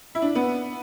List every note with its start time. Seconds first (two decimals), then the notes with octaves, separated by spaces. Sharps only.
0.15 E4
0.22 D4
0.35 B3